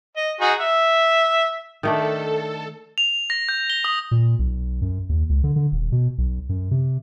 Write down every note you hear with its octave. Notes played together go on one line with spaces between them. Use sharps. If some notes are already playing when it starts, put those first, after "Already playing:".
D#5
D#4 F#4 G#4
E5
D#3 A3 D4 A4
F7
A#6
G6
G7
D#6
A#2
B1
F#2
D#2
C#2
D3
D3
D#1
B2
B1
F#2
C3